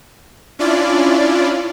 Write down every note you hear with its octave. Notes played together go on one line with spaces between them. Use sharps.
C#4 D4 E4 F4 D5